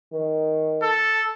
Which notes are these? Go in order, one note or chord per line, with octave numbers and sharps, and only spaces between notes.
D#3
A4